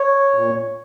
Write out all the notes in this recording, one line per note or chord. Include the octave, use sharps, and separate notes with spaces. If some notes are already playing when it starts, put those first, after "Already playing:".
Already playing: C#5
A#2